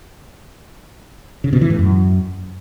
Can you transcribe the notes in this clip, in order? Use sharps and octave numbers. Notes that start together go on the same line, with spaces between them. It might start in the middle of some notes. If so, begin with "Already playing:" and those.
C#3
B2
E3
A2
F#2